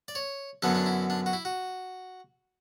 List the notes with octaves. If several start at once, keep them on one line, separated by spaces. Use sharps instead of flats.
D5
C#5
F#2 D3 F#3 B3 D4 A4
D4
E4
D4
F#4
E4
F#4